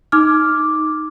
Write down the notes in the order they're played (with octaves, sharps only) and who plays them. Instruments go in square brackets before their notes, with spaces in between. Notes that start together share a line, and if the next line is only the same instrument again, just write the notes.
[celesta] D#4 D6 F6